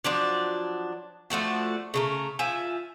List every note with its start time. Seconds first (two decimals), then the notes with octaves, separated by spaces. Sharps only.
0.05 F3 F#3 D4 D5
1.30 F3 A3 D4 F#4
1.94 C#3 A3 A#4
2.39 F3 E5 G#5